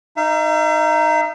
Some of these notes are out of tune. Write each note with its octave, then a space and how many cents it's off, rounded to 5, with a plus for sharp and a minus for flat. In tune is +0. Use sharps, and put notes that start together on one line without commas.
D#4 +0 E5 +45